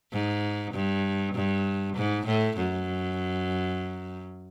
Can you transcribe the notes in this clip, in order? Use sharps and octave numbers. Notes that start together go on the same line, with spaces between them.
G#2
G2
G2
G#2
A2
F#2